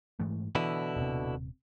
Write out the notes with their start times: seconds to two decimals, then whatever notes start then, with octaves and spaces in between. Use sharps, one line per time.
0.20 G#2 E3 A3
0.55 B2 D3 E3 E4
0.96 D#1 C3